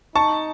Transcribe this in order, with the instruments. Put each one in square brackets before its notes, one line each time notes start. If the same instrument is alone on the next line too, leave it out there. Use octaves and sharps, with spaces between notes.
[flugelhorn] D#4 [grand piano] A5 C#6